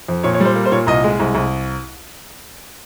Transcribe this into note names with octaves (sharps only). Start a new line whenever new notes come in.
F2
A#2 C#5
C#5
G3
C5
A#3
C5
A#2 C#5
C2 D#5
G#3
C2
C2